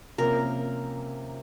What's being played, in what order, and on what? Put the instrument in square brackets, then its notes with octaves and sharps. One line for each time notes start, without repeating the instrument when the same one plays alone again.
[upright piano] C3 F3 A#3 C#4 [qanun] A#4